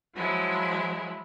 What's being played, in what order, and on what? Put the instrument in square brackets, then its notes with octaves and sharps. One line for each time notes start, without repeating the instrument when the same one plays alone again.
[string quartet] F3 F#3 G#3 E4